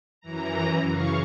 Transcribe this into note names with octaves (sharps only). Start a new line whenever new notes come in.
F#2 E3 A#5
C#3 F5 C#6